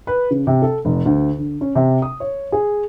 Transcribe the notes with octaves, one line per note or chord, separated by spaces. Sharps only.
B4
C#3
C3
A4
F1
D2
D3
C#4
C3
D#6
C#5
G#4